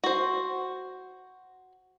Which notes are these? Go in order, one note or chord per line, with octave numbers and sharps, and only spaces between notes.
F#4 C5